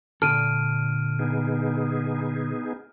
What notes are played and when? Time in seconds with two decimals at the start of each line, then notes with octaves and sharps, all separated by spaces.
0.22 A#2 D3 A4 F6 D7 D#7
1.19 B3 D#4 G#4